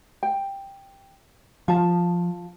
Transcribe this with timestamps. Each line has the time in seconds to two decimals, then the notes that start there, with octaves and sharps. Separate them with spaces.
0.23 G5
1.68 F3 F4 A5